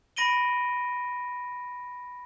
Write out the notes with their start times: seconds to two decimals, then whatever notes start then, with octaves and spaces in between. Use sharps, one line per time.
0.16 B5 A#6 D7 D#7 G7